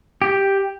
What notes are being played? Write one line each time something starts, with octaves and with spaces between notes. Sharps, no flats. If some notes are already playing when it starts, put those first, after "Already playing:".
G4